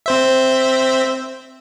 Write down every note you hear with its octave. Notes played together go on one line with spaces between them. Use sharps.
C4 C5 E5